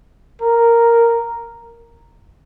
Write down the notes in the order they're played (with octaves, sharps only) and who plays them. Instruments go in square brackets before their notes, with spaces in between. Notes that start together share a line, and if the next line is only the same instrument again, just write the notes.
[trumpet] A#4